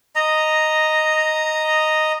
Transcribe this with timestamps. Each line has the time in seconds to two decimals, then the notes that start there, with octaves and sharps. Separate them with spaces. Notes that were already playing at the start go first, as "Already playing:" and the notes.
0.16 D#5 A#5